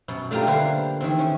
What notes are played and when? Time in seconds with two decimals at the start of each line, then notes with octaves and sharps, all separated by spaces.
0.08 F#2 B2
0.31 A3 D4 F4 G4 A#4
0.47 D3 A#3 B4 C5
1.01 D#3 E3 C4
1.19 C#4